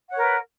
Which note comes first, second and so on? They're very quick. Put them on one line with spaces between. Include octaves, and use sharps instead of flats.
F#5 C#5 A#4 B4